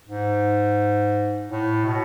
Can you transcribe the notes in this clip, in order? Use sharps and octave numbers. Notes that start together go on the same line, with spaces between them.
G#2
A2
B2